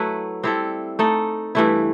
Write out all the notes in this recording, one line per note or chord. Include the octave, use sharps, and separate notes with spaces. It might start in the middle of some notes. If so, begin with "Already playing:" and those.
Already playing: F#3 A3 E4 B4
G3 C4 E4 A4
A3 D#4 A4
G2 E3 A3 E4